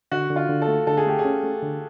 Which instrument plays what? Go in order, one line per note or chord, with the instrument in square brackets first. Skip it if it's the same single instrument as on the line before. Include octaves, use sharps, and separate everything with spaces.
[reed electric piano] D3 [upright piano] F#4
[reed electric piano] D3
[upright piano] F4
[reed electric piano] D3
[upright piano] A4
[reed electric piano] A3
[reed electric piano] D3 [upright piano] A4
[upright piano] G#4
[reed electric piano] A3 [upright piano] G4
[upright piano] G#4
[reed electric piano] C#4
A3
D3